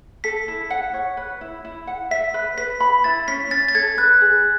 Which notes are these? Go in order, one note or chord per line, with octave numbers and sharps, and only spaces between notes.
A4 B6
E4
F#5
C#5
B4
E4
E4
F#5
E5 B6
B4
B4 B6
B5
E4 A6
C#4 B6
C#4 A6
A6
A4 G#6
B4 F#6
G#4